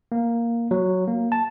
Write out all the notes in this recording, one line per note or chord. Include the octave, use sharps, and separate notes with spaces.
A#3
F#3
A#3
A5